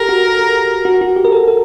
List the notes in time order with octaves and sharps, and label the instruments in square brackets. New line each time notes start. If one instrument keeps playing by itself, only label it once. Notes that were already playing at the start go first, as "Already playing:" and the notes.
Already playing: [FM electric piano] G4 A4 [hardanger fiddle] A#4
[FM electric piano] F#4
F#4
F#4
G4
A#4
A4
A4